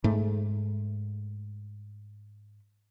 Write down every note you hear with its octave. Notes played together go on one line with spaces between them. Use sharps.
G#2 A3